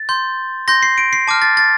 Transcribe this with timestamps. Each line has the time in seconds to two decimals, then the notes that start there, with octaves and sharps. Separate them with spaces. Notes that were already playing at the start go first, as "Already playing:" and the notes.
Already playing: A6
0.09 C6 G6
0.68 C6 G6 A#6
0.83 C7
0.98 D7
1.13 C7
1.27 A5 D6 F6
1.42 A6
1.57 A6